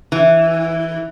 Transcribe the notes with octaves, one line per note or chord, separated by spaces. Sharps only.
E3